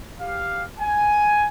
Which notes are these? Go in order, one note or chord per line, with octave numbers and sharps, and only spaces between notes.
G4 F5
G#5